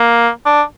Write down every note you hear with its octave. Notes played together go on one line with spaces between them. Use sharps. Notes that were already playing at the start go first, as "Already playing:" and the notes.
Already playing: A#3
D4